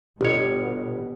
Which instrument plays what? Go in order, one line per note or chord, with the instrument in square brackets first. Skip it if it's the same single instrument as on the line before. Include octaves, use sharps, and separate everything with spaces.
[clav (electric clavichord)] G1 C#5 [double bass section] B2 [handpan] G4 D#5